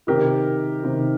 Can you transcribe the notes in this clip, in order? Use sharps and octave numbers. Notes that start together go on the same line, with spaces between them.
C3 D#3 G4 A#4
C3 D#3